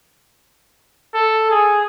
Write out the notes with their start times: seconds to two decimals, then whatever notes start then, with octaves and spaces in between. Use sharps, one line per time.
1.14 A4
1.50 G#4